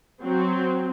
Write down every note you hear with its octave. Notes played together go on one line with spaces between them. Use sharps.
F#3 C4